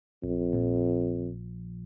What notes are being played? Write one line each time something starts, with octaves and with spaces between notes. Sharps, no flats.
A#1 F2
A#2 F3